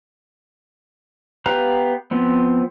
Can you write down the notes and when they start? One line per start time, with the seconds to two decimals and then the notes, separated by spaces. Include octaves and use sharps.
1.46 B3 G4 B4 F5 A#5
2.11 F3 B3 C4